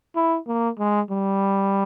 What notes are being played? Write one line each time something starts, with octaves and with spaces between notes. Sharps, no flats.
E4
A#3
G#3
G3